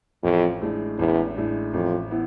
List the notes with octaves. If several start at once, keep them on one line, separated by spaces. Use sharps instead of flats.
A1 F2
A2 G#3 D4
A1 E2
A2 G#3 D4
A1 F2
E3 B3 E4